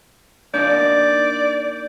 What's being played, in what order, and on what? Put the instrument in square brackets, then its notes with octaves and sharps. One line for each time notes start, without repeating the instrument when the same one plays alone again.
[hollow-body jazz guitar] A#3 D4 D#4 [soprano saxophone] D5 [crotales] G6